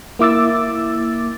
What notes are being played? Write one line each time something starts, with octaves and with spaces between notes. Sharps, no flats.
A#3 E4 D6 E6 A6